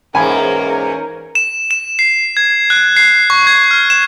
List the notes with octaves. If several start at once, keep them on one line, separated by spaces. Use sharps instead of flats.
E2 G#2 A#3 C#4 A#4 G#5 B5
E7
E7
C7
G#6
F#6
C7
C#6
G#6
F6
E7